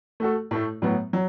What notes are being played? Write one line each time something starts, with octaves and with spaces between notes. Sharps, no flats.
A3 F#4 A4
A2 A3 E4 A4
A2 F#3 B3
F#3